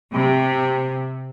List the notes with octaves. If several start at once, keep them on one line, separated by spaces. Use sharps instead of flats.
C3